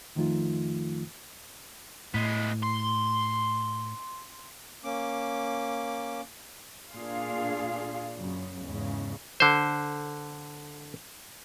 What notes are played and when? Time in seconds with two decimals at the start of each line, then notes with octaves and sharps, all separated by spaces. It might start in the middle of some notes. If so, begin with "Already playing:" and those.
0.15 F2 D#3 F3 A3 D#4 F4
2.14 A2 G#3 B3
2.63 C6
4.84 A#3 C#4 D6
6.94 A#2 D4 F4 G#4 F5
8.17 F#2 C#3
8.63 E2 G#2 C#3
9.40 D3 C5